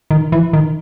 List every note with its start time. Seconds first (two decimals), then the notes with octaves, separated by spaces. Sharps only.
0.11 D#3
0.32 E3
0.53 D#3